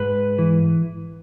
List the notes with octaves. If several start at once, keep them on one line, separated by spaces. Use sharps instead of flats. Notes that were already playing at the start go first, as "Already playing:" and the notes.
Already playing: G#2 B4
E3